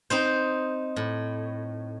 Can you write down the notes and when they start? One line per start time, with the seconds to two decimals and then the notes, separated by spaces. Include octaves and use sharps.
0.10 C4 D#4 C5
0.96 A2